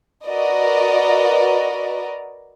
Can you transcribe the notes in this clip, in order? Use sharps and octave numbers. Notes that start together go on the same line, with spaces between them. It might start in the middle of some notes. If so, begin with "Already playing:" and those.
F#4 A#4 B4 D5 D#5